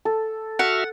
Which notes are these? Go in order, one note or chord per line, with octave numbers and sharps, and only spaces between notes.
A4
F#4 E5 F#5 F6